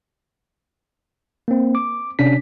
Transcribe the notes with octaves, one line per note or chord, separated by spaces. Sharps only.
A#3 C4
D6
C3 C#4 D4 B6